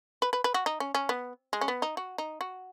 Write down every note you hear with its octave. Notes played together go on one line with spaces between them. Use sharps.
B4
B4
B4
F#4
D#4
C#4
C#4
B3
G#3
C#4
B3
D#4
F#4
D#4
F#4